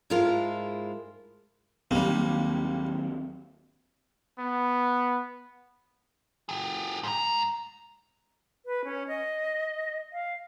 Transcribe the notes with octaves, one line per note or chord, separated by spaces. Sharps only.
G#2 G#3 E4 F4 A#4 A5
D#2 D#3 F#3 G3 A#3 C4
B3
G4 G#4
G#2 A#5
B4
C#4
D#5
F5